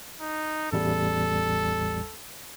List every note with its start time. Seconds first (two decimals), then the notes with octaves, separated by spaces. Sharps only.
0.21 D#4
0.73 A1 E2 G3 A4